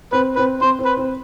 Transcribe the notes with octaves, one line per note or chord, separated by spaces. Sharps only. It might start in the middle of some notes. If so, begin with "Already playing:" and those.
C4 B4
C4 B4
C4 C5
C4
B4
C4